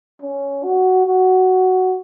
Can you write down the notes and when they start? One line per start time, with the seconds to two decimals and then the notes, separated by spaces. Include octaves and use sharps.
0.21 C#4
0.63 F#4
1.06 F#4